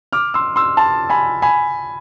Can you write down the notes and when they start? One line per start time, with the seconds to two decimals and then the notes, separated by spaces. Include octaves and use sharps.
0.13 D6 F6
0.34 C6 E6
0.56 C6 E6
0.77 A5 C6
1.10 G#5 B5
1.42 G#5 B5